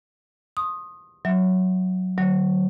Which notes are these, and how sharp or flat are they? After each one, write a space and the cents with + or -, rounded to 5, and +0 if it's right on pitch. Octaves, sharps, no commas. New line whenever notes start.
C6 +35 D#6 +0
F#3 +0 E5 +0
D3 +30 F#3 +15